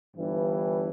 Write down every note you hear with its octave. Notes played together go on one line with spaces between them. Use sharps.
G1 G2 E3